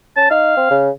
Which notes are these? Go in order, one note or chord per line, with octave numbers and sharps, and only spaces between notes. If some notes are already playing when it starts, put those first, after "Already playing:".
C#4 A5
D#4 F5
C4
C#3